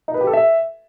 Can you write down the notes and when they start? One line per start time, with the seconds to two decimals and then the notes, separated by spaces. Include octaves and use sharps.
0.08 D#4
0.14 B4
0.21 G4
0.27 A4
0.33 E5